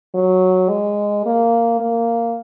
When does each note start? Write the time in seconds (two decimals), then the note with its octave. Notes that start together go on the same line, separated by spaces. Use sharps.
0.14 F#3
0.69 G#3
1.26 A#3
1.80 A#3